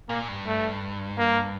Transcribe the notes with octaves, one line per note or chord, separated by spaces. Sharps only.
A#2 A#3
G2
A3
A#3